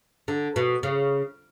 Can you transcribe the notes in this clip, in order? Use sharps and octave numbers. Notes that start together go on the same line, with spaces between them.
D3
B2
C#3